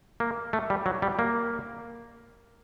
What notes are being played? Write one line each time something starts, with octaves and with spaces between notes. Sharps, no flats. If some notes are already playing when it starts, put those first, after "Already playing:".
A#3
A3
G3
F#3
G3
A#3